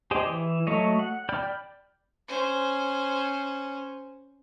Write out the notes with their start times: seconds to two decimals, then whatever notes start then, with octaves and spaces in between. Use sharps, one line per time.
0.11 G4 G#4 C5 D5 D#5
0.26 E3
0.67 F#3 A3 C#5 D#5
0.99 F#5
1.29 D5 G5 B5 F6 G6
2.28 C#4 C5